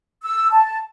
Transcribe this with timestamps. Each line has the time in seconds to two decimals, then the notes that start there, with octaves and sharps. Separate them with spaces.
0.23 E6
0.51 A5